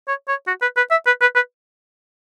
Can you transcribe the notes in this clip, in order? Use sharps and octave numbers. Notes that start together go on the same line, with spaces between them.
C#5
C#5
F#4
B4
B4
E5
B4
B4
B4